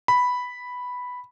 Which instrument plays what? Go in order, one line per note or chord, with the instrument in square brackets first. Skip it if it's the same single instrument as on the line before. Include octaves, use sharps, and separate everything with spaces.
[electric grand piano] B5